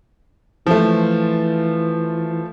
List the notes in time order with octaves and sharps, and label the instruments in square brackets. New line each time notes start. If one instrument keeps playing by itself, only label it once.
[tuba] E3 [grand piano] F3 A3